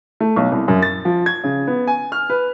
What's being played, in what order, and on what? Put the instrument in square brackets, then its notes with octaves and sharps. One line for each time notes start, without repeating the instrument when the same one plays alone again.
[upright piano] A3
B1
C2
F#2
A6
F3
G#6
C#3
B3
G#5
F6
B4